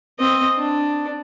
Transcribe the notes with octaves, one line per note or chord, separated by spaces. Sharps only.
C4 D#5
D4